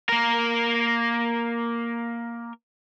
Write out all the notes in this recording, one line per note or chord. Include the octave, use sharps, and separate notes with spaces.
A#3 A#4